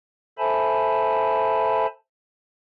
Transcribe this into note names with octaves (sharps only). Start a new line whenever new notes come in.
A4 C5 E5 G#5 A5 B5